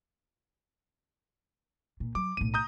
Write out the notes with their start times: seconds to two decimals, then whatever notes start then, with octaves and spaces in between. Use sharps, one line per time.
2.00 A#2
2.15 F#3 D6
2.37 B1 A2 D#7
2.54 A#5 D#6 G6